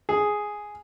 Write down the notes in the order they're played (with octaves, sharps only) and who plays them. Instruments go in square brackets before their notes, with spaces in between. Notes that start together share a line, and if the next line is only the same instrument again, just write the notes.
[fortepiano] G#4